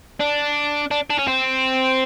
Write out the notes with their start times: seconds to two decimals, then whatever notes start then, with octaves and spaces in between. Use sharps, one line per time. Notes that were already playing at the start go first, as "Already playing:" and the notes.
0.20 D4
0.91 D4
1.10 D4
1.18 C#4
1.27 C4